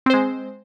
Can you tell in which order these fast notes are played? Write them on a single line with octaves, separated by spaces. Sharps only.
C4 C5 G#3